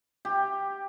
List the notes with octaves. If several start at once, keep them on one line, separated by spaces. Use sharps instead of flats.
G4